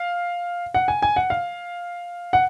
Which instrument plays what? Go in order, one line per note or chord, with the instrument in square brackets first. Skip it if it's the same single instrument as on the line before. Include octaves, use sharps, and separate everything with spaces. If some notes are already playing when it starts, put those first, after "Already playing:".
Already playing: [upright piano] F5
F#5
G#5
G#5
F#5
F5
F#5